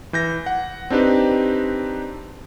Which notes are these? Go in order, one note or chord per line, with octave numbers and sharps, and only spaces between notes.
E3 G6 A#6
F#5
C4 D4 D#4 G4 B4